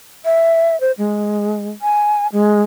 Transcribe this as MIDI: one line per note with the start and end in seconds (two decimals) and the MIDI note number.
0.25 0.79 76
0.81 0.92 72
0.98 1.69 56
1.82 2.27 80
2.33 2.61 56